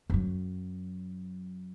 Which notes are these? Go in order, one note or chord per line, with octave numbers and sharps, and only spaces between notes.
F#2 F#3